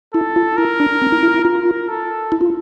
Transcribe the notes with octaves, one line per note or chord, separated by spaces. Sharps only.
E4 A4
F4
E4 A#4
D4
C4
E4
E4
E4
F4 A#4
A4
E4
F4